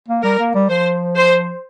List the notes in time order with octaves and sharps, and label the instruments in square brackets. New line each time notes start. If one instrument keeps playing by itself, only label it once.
[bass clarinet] A#3
[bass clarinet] G3 [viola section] A#4
[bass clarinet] A#3
G3
[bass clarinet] F3 [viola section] C5
[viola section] C5